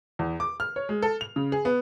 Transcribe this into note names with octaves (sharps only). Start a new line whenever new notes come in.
E2
D6
F6
C#5
G#3
A4
F7
C#3
G#4
B3